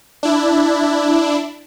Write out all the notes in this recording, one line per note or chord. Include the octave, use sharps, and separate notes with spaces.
D4 E4